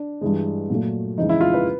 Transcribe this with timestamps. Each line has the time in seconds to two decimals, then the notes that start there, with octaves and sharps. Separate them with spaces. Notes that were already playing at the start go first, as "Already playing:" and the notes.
Already playing: D4
0.21 G2 E3 G#3
0.70 A#2 F#3 A3
1.18 F2 C#3 E3 G#3 D#4
1.29 E4
1.41 F4
1.54 B4